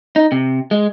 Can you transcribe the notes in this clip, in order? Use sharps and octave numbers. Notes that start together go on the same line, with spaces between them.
D#4
C3
G#3